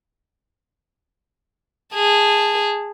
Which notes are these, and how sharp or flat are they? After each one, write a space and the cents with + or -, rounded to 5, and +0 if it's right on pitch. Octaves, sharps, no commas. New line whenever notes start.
G#4 -10 A5 +0